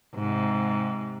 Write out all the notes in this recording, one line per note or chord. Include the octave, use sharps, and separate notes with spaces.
G#2 C3